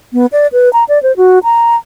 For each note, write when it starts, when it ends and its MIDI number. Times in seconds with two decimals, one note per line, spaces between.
0.13 0.26 59
0.32 0.47 74
0.53 0.72 71
0.73 0.84 82
0.89 1.01 74
1.03 1.15 72
1.17 1.39 66
1.44 1.76 82